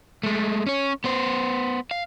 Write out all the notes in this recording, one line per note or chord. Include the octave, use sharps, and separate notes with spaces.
G#3 A3
C#4 C#5
B3 C5
F5